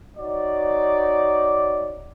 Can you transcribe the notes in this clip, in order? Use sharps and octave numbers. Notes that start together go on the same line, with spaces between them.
D#4 F#4 C#5 D5